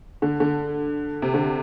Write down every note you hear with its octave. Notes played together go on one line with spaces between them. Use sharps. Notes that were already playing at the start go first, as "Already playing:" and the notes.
D3
D3
C3
D3